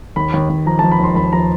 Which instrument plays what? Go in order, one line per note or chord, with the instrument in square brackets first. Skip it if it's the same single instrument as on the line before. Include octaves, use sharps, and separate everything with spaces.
[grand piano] D#2 B5
D#2
D#2
F3 A#5
F3 A5
B5
D#2 C6
D#2 B5
F3 A#5